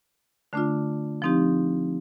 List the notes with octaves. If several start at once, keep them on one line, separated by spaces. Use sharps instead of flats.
D3 A3 D4 F4
F3 C4 D#4 G4